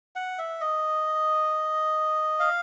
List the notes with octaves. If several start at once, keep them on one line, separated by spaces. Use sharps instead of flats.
F#5
E5
D#5
F5